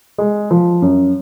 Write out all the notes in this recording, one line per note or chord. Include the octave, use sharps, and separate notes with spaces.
G#3
F3
F#2